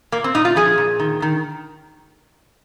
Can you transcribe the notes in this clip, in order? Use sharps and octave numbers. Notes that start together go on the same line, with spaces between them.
A#2 A#3
C4
A#2 D#4
F4
F3 G#4
A#2
D#3
D#3